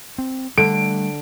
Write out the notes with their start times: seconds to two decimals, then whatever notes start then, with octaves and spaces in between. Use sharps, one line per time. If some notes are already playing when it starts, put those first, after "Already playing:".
0.18 C4
0.58 D3 G3 A3 D7